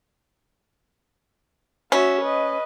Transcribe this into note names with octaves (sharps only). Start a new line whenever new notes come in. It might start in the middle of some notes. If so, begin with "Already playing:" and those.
C#4 F#4 E5
B4 D#5